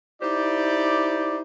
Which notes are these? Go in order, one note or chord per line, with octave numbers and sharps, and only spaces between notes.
D#4 E4 G4 C5 D5